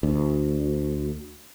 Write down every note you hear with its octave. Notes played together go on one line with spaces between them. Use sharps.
D2